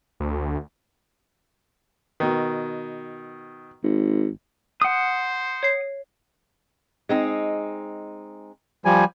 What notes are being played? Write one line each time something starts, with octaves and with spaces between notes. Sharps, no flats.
D2
B2 D#3
G#1
C5 F#5 D#6
C#5 C7
G#3 C4 D#4
F3 G3 G#5